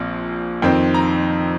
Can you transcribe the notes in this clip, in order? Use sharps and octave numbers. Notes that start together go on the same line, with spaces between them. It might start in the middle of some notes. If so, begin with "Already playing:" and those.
Already playing: A#1 A#2 F3 C4
F2 D#3 C4 G5
A#5